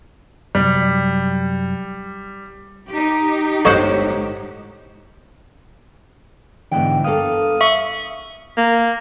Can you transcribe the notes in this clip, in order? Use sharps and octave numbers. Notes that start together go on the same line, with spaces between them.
F#2 C3 F#3 G3
D#4 G4
G1 A2 G#3 F#4 C5 C#5 D#5 F#5
G#2 B2 D3 E3 G5
G2 A#3 A4 F5 D#6
E5 C#6
A#3